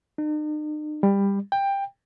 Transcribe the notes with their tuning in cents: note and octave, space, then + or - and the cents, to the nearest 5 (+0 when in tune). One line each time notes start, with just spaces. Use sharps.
D#4 -45
G3 +20
G5 +15